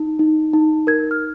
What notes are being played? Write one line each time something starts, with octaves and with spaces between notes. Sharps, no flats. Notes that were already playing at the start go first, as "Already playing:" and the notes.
Already playing: D#4
D#4
D#4
A#4 G#6
F6